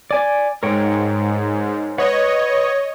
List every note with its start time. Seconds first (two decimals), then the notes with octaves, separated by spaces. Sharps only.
0.11 D5 G#5 D6
0.63 G#2 A#4 C#5 G5
1.98 B4 C#5 D#5 F#5